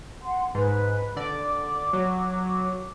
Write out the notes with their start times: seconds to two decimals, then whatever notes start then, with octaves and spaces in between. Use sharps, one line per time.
0.22 F#5 C6
0.55 G#2 B4
1.16 D3 D5 D6
1.93 F#3